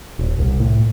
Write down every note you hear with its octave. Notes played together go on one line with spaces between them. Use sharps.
D#1
C2
A2